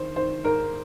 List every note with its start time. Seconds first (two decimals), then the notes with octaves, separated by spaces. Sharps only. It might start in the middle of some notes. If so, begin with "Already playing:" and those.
Already playing: D#3 C5
0.16 D#3 C5
0.44 G#2 A#4